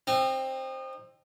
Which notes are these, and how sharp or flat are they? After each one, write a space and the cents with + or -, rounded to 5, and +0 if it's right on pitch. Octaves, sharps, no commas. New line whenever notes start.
C4 +15 D#4 -30